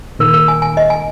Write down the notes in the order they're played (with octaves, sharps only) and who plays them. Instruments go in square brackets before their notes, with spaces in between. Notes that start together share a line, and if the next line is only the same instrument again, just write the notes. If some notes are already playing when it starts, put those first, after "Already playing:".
[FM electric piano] A#2 D#3 [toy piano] A#4
[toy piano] A#4
G#5
G#5
D#5
G#5